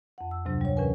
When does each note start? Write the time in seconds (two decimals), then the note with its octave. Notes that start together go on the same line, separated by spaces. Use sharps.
0.18 F2 F#5
0.31 E6
0.45 D2 G#2 C3 F#3 D4
0.61 G3 C#5
0.77 A2 E3 C#4 A#4 B4 G#5